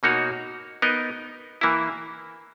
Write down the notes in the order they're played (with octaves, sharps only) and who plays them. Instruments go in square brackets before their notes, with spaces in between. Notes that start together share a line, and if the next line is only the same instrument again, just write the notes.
[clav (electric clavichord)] B2 A#3 D#4 F#4 C#5
B3 D#4 A#4 D#5
E3 A#3 E4